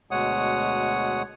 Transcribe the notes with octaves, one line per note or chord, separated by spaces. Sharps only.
D2 B2 G#3 C#5 F#5 D#6